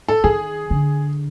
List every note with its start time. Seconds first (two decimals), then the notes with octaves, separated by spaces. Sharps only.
0.08 A4
0.24 D#3 G#4
0.70 D3